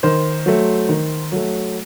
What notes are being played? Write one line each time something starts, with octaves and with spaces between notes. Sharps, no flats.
D#3 C5
F#3 A3
D#3
F#3 A3